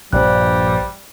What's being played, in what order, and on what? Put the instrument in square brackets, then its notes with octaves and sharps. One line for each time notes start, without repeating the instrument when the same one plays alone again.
[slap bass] A#1 G2 [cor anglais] G3 [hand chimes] C5 D5 F#6